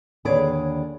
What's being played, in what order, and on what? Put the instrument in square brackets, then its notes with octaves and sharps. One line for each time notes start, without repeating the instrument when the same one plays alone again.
[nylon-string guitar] D#2 D3 G#4 B4 C#5 D5